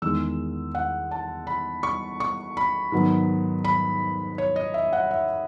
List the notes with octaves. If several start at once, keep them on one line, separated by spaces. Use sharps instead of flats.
E2 D#3 G#3 E6
F#5
A5
B5
C#6
C#6
B5
G#2 D#3 F#3 B3
B5
C#5
D#5
E5
F#5
E5